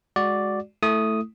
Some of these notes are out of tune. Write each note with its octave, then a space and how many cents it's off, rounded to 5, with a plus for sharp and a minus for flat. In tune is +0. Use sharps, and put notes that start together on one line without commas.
G#3 +0 F#4 +0 D5 +0
A3 +0 E4 +0 D#6 +0